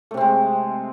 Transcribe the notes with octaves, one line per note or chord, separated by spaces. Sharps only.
C3 G#3 A3 C4